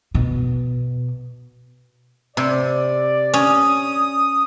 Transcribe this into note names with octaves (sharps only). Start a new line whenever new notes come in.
B2
C3 D5
C#4 D#6